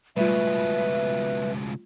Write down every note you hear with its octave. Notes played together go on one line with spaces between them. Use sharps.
C#2 B2 G3 A3 F4 B4 E5